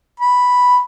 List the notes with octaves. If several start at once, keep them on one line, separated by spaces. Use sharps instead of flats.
B5